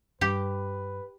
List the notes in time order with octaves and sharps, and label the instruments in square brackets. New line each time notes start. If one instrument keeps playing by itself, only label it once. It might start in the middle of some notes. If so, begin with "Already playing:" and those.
[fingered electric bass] G2 [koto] G4 [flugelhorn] B4